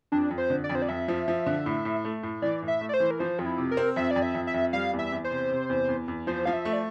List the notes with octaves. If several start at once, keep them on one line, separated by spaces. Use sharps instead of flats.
F2 D4
F2
C5
D3
D5
F2
C5
D5
F2 E5
F3
F3
D3
A2
A2
A3
A2
E3 D5
A2
E5
A3
D5
C5
E3
A#4
F3 C5
F2 F4
E4
C3
A#4
C4
F2 E5
F2 D5
E5
F2
E5
F2
G3 F5
E2
E5
E2
C5
C3
C3
E2
E2
E2
F3 C5
F3 F5
E5
A3
D5